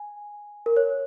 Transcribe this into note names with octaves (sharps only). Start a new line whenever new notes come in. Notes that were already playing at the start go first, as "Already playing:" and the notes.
Already playing: G#5
A#4
C#5